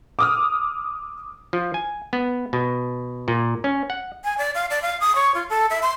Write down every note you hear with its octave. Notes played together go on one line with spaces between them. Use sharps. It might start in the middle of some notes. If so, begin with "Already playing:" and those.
D6 D#6 F6
F3
G#5
B3
B2
A#2
C#4
F#5
G#5
D5
F5
D5
F5
D#6
C#5
F4
A4
E5
C6